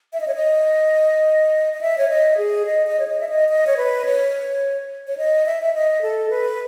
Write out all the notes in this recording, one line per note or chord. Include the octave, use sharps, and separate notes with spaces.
E5
D#5
C#5
D#5
D#5
E5
C#5
D#5
G#4
D#5
D#5
C#5
D#5
E5
D#5
D#5
C#5
B4
C#5
C#5
D#5
E5
E5
D#5
A4
B4